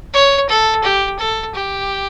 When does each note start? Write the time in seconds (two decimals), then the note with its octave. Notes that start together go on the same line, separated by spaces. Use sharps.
0.13 C#5
0.49 A4
0.83 G4
1.19 A4
1.55 G4